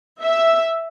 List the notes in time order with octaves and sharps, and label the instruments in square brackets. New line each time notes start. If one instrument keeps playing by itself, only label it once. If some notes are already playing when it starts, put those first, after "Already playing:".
[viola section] E5